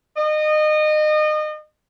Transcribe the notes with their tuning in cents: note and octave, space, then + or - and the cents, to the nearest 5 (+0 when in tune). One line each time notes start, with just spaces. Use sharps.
D#5 -30